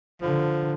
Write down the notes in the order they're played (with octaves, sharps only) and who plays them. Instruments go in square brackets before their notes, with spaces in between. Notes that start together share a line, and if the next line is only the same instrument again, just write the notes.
[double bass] D3 [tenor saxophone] F3